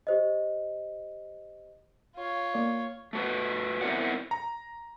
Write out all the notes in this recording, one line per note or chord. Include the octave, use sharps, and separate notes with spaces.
G4 C5 D#5
F4 C#5
A#3 D5
A3 F#4 B4
B3 C4 E4 A#4 D5 F#5
A#5